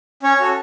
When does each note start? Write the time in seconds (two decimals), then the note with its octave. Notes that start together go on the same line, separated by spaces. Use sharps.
0.23 C#4 C#5
0.40 F#4 A4